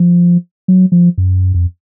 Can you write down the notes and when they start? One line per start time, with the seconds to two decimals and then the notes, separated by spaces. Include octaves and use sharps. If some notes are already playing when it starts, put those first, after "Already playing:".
Already playing: F3
0.68 F#3
0.92 F3
1.18 F#2
1.54 F2